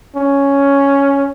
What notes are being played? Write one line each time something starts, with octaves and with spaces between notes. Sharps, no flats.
C#4